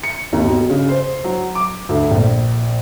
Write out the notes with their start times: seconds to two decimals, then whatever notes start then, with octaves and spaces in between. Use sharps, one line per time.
0.03 C#7
0.33 D#2
0.45 B1
0.70 C#3
0.89 C5
1.24 F#3
1.55 D6
1.89 D2
2.11 A#1